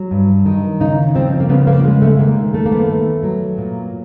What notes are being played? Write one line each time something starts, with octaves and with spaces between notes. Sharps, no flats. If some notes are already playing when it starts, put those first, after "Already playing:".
Already playing: F#3
G2
D#3
C#3 D#4
F3 C4
A#3
C#3 B3
A#3
G#3
A3
D#3 A#3
A3
A#3
B3
A3
F#3
A#2